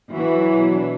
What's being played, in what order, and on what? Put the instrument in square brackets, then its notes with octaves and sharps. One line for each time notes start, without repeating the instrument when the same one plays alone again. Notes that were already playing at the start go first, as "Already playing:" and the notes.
[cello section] E3 [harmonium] F#4
[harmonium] F#3
B2
D4